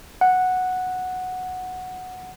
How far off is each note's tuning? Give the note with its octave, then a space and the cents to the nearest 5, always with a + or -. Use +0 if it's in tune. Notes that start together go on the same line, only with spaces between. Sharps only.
F#5 -5